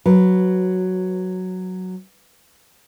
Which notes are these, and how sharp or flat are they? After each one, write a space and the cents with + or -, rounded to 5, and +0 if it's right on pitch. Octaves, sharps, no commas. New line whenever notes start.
F#3 +0 B4 +0